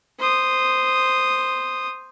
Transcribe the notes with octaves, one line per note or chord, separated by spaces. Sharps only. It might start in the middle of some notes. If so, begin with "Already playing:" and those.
C5 D#6